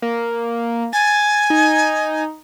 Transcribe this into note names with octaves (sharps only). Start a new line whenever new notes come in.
A#3
G#5 A6
D#4